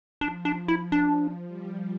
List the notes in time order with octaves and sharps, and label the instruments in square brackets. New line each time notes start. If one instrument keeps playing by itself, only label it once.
[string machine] F3 [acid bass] D4
[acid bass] D4
E4
D4
[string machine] F3
G3